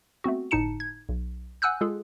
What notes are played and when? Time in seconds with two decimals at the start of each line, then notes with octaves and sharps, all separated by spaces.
0.24 A3 B3 C4 F#4
0.51 G1 A2 D#4 A5 C#7 E7
0.80 G#6
1.09 B1
1.62 F#5 G#5 E6 F#6 G6
1.81 G#3 F4 G#4 A4